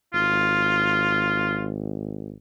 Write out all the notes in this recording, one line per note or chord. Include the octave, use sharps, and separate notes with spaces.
G#1 F4